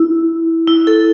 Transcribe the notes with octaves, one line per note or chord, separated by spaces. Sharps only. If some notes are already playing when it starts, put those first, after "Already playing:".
Already playing: E4
E4
A4